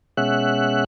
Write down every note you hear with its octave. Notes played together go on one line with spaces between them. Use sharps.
B2 G#3 C#4 E5 F#5 F#6